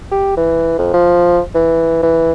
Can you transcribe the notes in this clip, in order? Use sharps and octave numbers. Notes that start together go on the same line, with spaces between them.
G4
E3
F2
F3
E3
E3